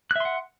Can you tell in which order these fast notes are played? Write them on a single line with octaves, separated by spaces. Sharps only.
F#6 E5 C6 F#5